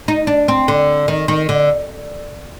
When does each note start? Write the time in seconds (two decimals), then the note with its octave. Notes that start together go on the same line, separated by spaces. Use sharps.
0.08 D#4
0.27 D4
0.48 C4
0.68 D3
1.08 D#3
1.28 D#3
1.49 D3